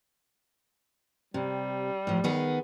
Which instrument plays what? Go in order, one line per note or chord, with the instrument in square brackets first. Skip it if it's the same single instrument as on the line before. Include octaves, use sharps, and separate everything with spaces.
[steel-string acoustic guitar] C3 [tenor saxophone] G3
[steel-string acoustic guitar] A2 F3
D#3 B3 G#4